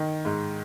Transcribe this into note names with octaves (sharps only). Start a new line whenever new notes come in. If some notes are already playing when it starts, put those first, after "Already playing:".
Already playing: D#3
G#2